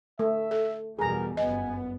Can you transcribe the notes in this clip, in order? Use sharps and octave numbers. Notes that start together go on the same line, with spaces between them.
A3 E5
A4
E2 B2 G3 G#4 A#4 A#5
G1 F#2 B3 D#5 G#5